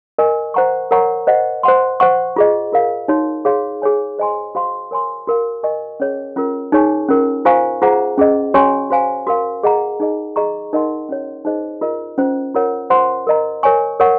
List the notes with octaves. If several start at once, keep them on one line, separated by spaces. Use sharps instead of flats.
A#4 D#5 G#5 C#6
C5 F#5 A#5 C#6
A#4 C#5 F#5 A#5 C#6
C5 D#5 F#5
C5 F#5 C6
C5 F#5 C#6
F4 G#4 D#5
F4 A#4 F5
D#4 F#4 C#5
G#4 C#5 F5 C6
G#4 C#5 G#5
C5 D#5 G#5 C6
F#4 C5 F5 C6
A#4 C#5 G#5 C6
F#4 A#4 F5
A#4 D#5 G#5 C#6
C#4 G#4 C#5
C#4 F4 A#4
D#4 G#4 C#5 G#5 C#6
C#4 F4 A#4
F4 C5 F5 G#5 C#6
F4 G#4 C5 F#5 A#5
C#4 G#4 D#5
C#4 F#4 C#5 G#5 C#6
F#4 C5 F5 G#5
F#4 A#4 F5
G#4 D#5 F#5 A#5
D#4 G#4 D#5
G#4 D#5 A#5 C#6
D#4 A#4 D#5 F#5 C6
C#4 F#4 C#5
D#4 G#4 C5 D#5
F4 A#4 D#5
C#4 F4 C5
F4 A#4 C#5 F#5
F4 C5 F#5 C6
A#4 D#5 A#5
A#4 C#5 G#5 C#6
A#4 C#5 F#5 C#6